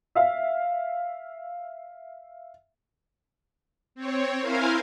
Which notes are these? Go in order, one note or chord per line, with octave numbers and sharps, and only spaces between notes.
E5 F5
C4 C#5
E4 A#4 C5 F5 G#5